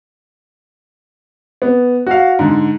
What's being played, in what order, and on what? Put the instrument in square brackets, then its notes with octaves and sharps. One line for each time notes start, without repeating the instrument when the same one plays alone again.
[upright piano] B3
F#4 F5
G#2 D3